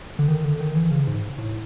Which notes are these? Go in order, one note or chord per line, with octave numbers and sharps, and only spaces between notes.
D3
D#3
D3
D#3
E3
C#3
G#2
A2